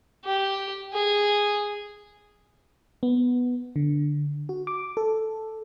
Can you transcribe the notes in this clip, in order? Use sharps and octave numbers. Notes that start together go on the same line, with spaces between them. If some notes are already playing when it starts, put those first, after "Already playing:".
G4
G#4
B3
D3
F#4
D6
A4